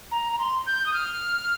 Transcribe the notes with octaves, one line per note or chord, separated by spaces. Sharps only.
A#5
A#5
C6
G6
D#6
F6